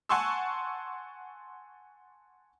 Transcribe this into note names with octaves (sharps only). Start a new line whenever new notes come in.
F#5 G#5 A5 C6 C#6 E6